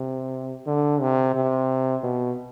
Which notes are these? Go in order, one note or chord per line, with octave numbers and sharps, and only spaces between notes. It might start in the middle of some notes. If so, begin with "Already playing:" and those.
Already playing: C3
D3
C3
C3
B2